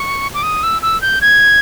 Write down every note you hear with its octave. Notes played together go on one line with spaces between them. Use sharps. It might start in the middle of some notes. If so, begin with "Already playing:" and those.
Already playing: C#6
D6
D#6
E6
E6
G6
G#6